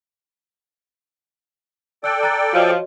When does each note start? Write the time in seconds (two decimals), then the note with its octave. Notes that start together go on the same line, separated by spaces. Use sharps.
2.04 A4 D5 G5 E6 F#6
2.23 A#5 F#6 A6
2.53 F3 F#4 C#5 D#5